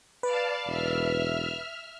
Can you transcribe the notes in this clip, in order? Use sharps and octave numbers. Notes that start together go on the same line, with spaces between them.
B4 D5 F5 A5
E1 E5 F6